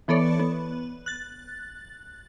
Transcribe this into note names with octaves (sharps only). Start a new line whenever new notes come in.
E3 B3 A4 C#5 D5
B3
F#6 A6